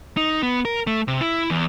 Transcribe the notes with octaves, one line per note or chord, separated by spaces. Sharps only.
D#4
B3
A#4
A3
C3
E4
E2